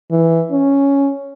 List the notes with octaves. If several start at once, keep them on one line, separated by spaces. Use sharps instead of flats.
E3
C#4